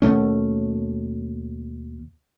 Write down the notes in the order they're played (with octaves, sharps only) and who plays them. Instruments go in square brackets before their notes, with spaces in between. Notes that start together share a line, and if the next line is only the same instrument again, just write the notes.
[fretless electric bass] D#2 B2 A3 C#4